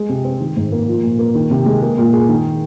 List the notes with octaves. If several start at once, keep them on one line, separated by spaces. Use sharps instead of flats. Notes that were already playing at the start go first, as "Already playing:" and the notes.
Already playing: G#3
C3
C4
D#3
G#2
A#3
F3
A#2
A#3
D#3
C3
G#3
A#3
A#2
G#4
D#3